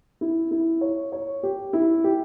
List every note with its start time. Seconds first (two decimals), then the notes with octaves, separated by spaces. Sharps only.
0.21 E4
0.51 E4
0.81 C#5
1.12 C#5
1.43 G4
1.73 E4
2.04 G4